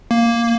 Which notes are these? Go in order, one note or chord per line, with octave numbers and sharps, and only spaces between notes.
A#3